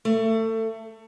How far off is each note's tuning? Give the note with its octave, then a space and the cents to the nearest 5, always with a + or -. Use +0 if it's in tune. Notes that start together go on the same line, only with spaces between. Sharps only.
A3 +25